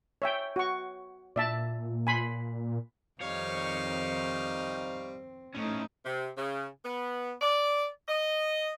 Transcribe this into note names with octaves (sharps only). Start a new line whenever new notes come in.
C#5 E5 G5
F#4 C#6
A#2 D5 E5 A5
G#5 B5 C6
F2 D#3 G3 C4 D#4 C#5 F5
A2 A3 C#4 D#4
C3
C#3
B3
D5
D#5